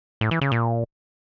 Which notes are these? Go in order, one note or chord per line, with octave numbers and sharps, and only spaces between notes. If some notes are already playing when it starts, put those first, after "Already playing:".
A2
E3
C#3
A#2